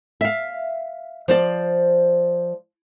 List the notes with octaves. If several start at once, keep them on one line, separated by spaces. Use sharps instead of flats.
E5 F5
F3 C5 D5